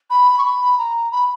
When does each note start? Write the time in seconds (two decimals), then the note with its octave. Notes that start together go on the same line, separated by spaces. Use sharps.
0.10 B5
0.38 C#6
0.44 B5
0.78 A#5
1.12 B5